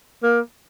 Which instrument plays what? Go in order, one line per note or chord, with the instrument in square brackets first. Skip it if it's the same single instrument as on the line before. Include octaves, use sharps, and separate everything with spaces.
[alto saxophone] A#3